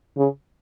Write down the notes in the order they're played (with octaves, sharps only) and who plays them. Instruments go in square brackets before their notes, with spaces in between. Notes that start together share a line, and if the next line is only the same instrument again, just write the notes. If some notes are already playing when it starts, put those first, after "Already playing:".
[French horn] C#3